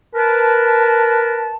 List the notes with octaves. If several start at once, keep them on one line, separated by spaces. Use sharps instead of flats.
A#4 B4 A5